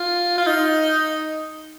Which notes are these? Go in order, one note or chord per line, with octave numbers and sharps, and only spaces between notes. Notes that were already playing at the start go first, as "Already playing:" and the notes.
Already playing: F4
F4
D#4